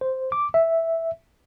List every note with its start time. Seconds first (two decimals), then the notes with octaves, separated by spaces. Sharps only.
0.01 C5
0.32 D6
0.54 E5